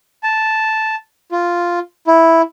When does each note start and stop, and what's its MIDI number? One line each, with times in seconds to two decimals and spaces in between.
0.23 0.95 81
1.32 1.79 65
2.07 2.42 64